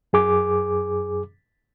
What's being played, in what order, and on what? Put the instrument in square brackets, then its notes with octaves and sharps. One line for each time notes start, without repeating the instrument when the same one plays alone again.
[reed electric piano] F#2 G#4 D6